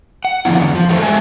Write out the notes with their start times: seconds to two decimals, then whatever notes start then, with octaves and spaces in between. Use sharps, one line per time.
0.25 F#5
0.45 D3 E3 F3 B3 E4
0.56 E2 D3
0.75 F3
0.89 F3 F#3 A3 G4 A4 C5
1.02 G#3 E5 G#5 A5